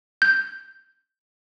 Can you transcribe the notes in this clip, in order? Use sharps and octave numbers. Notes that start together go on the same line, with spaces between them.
G6